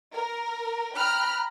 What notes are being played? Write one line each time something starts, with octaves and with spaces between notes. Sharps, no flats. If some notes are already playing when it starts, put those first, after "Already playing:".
A#4
G5 A#5 B5 F6 F#6